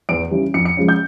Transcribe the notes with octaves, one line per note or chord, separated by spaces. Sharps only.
E2 D7
C#3 E3 G3
F2 C#7
C#7
C#3 F3 G#3
G6